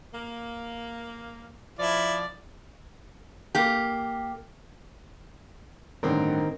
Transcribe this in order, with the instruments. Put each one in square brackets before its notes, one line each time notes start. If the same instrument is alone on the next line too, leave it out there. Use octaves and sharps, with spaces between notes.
[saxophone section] A#3
[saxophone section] F3 [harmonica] E4 [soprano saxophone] D5
[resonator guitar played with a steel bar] A#3 G4
[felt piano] A1 G2 D3 [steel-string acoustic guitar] D#3 C4 A#4